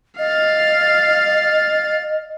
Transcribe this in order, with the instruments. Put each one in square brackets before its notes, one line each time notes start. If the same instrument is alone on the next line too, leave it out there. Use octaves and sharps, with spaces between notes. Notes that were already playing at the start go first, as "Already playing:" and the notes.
[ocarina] D#5 [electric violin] F5 A6